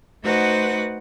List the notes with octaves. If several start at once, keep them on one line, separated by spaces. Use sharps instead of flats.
A3 D#4 F#4 B4 C5 F#5